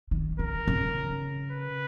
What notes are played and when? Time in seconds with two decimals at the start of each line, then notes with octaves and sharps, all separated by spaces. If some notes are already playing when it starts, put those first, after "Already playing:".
0.11 D#3
0.39 D3 A#4
0.68 C#3
1.52 B4